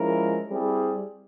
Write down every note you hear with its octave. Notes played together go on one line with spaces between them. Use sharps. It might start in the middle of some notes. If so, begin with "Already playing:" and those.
Already playing: F3 G#3 C#4 E4 A#4
G3 C4 E4 G#4